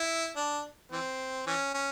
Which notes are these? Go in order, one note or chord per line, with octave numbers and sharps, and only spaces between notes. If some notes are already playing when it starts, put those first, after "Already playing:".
Already playing: E4
D4
E3 C4
E3 C#4
C#4